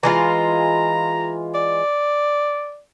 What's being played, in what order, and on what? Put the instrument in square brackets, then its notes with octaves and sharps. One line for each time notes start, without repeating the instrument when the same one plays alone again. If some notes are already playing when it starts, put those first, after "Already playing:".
[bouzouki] E3 G#3 F4 [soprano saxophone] A#5
[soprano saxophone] D5